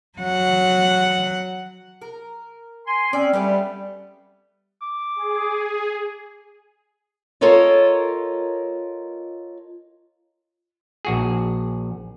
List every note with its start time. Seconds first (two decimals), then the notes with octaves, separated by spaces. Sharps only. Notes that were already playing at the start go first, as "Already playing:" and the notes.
0.18 F#3 F#5
2.02 A#4
2.86 G#5 C6
3.13 C4 C#4 D5
3.33 G3 A3 B3 G4
4.82 D6
5.16 G#4
7.41 F4 A4 A#4 C#5 D#5
11.05 A#1 F#4 G#4